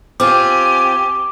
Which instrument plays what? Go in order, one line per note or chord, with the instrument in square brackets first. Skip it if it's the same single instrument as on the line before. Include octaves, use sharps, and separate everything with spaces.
[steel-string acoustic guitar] C4 F4 [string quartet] G4 G#5 [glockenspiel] D6